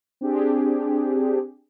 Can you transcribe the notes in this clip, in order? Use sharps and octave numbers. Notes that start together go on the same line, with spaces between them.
C4 D4 G4 G#4